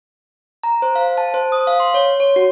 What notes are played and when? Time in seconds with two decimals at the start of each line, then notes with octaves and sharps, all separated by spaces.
0.64 A#5
0.82 C5
0.95 F5
1.18 A5
1.34 C5
1.52 D#6
1.67 F5
1.80 C6
1.94 C#5
2.20 C#5
2.36 F#4